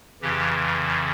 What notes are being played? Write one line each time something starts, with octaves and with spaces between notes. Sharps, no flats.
F2 C#3 E3 G4